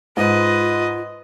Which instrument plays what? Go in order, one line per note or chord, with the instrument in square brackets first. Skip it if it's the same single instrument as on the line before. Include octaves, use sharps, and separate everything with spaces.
[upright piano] G#2 [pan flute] F4 [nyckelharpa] B4 D#5